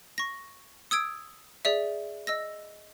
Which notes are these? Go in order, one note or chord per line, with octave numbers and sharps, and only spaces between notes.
C#6 A#6
D#6 E6 G#6 D7
G#4 D5 E5
D#5 E6 A#6